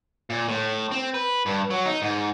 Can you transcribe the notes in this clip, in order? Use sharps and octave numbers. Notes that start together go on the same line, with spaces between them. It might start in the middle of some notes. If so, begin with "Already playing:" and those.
A#2
A2
C4
B4
G2
F#3
D#4
G#2